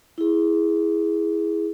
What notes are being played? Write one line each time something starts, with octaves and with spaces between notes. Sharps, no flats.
E4 G#4